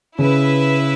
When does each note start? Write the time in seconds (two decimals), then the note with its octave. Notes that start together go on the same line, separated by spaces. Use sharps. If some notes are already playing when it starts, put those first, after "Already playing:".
0.18 C#3 E4 B4 E5